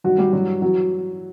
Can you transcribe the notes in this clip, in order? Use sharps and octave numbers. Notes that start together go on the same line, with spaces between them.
G2 D#3 F#3 F#4
G3 G4
G2 E3 F#3 F#4
E3 F#3 F#4